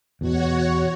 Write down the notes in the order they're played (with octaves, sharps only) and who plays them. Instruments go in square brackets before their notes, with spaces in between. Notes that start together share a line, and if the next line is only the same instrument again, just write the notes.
[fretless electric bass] E2 B2 [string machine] F#4 C#5